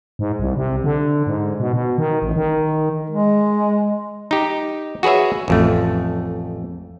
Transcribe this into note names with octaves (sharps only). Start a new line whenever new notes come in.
G#2
C2
C3
D3
G#2
B2
B2
D#3
A1
D#3
G#3
D#4 G4
F#4 G#4 B4 C#5 E5
A1 F2 A3